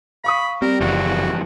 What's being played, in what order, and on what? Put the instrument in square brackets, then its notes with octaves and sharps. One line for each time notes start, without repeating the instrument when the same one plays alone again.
[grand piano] F5 C#6 D#6 [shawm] B5
[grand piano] G3 [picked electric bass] C4 [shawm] A#4
[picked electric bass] F#1 [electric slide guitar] F2 G#2 E3 [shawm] F#4